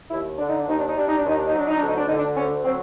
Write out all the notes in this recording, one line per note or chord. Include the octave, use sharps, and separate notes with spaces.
D#2 E4
D3 D4
D#4
D4
D#2 D#4
D4
D#4
G3 D4
D#4
D4
D#2 D#4
D4
F#3 D#4
D4
D#4
D2 D4
D#4
D4
D3 D#4
D4
D2 C#4
F#3 C4